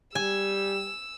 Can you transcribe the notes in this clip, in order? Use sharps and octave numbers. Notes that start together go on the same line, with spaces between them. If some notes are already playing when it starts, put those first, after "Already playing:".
G3 G4 G#5 E6